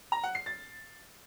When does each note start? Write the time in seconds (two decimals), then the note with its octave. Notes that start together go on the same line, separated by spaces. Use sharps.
0.12 A#5
0.23 F#5
0.35 C7
0.46 A6